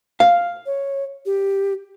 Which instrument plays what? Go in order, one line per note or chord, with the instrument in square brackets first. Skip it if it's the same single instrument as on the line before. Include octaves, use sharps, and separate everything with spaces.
[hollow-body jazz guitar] F5
[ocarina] C#5
G4